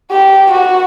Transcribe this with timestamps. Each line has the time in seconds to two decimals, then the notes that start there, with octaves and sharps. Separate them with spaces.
0.11 G4
0.52 F#4